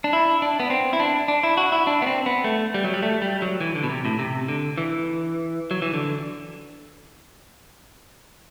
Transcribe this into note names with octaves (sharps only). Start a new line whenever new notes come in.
D4
E4
D4
B3
C4
E4
D4
D4
E4
F#4
E4
D4
B3
C4
B3
A3
G3
F#3
G3
A3
G3
F#3
E3
D3
B2
C3
A2
C3
D3
E3
F#3
E3
D3